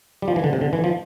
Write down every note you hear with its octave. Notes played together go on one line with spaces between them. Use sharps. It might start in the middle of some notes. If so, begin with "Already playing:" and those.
G3
F3
E3
D3
C3
D3
E3
F3